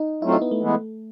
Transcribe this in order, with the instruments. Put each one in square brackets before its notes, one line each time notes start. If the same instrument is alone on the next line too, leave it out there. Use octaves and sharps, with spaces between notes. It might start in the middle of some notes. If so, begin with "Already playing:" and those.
Already playing: [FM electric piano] D#4
[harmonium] F#3 A3 C4 F4 [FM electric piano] E4
[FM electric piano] D#4
B3
A3
[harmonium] E3 G#3 B3 E4